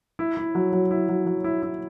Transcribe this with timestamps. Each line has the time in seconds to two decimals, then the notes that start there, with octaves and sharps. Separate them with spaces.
0.19 E4
0.37 E4
0.55 F#3
0.73 F#3
0.91 E4
1.09 F#3
1.26 F#3
1.44 E4
1.62 E4